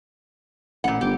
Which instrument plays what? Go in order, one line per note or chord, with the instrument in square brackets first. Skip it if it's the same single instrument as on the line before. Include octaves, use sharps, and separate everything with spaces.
[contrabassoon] A1 [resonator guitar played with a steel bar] A#2 F#5
[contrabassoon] G1 [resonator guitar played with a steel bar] G4